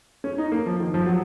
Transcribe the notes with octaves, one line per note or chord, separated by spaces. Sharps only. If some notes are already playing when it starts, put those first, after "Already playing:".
C#4
D#4
A#3
F3
D#3
F3
F#3